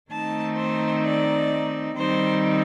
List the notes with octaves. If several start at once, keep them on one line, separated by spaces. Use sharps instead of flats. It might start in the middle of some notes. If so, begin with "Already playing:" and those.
D#3 A3 C4 D#4 A5
C5
D5
D#3 G3 C4 D#4 C5